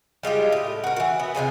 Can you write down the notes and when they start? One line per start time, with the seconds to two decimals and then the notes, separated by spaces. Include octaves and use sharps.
0.23 G3 G#3 F4 G4
0.52 A2
0.84 F#4 A#4
0.96 E3 F#4
1.19 B3
1.35 C3 E3 F4 G#4